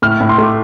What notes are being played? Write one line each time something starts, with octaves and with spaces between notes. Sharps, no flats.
A2 F6
A2
C6
A3 D6